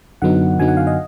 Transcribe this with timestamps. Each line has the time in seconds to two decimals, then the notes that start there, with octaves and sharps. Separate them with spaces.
0.22 F#2 D3 F#3 B3 D#4 F#5
0.59 F#2 D3 F#3 B3 D#4 G#5
0.68 F#5
0.77 F5
0.87 D#5